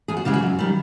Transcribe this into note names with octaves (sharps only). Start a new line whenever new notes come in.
E2 G#4
F#4
C#3 E3 G#3 G4
F#4
F#2
D#3 G3